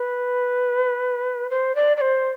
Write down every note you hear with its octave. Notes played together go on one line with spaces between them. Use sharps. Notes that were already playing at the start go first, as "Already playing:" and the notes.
Already playing: B4
C5
D5
D5
C5